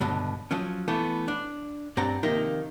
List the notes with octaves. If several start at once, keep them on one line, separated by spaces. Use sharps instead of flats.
C#2 G2 B2 D3
F3 F#3 C#4
E3 A3 B3
D4
G2 C4 D5 F#5 A#5
C3 D#3 F3 A#3 D#4